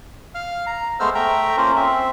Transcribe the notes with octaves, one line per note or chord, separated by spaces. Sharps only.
F5 F6
A#5
G#3 A3 B3 C5 E6 F6
A3 E5 G5 A#5
A#3 C#4 F4 A#4 C5
C4 E5